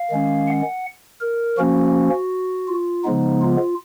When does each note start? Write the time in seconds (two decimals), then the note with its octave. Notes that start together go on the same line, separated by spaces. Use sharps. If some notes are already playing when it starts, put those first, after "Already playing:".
Already playing: F5
0.10 D#3 G#3 C#4
0.47 F#5
1.21 A#4
1.57 F3 A#3 C#4 F#4
2.68 F4
3.04 C#3 F3 G#3 B3 D#4
3.42 F4